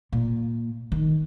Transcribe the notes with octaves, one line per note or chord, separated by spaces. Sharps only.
A#2
D#3